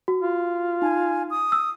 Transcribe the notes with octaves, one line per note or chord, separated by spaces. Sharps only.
F#4
F4
D#4 G#5
D#6
E6